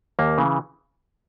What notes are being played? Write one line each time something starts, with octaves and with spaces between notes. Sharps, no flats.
D#2 A#3
C#3 E3